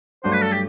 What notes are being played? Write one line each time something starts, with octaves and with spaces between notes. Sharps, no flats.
G2 F#3 A3 D4 F#4 C5
B4
A4
G4